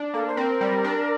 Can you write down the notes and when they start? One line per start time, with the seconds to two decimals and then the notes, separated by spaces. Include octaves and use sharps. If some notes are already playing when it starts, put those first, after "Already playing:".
Already playing: D4
0.14 A#3 A4
0.27 C5
0.37 C4 A#4
0.61 G3
0.84 D4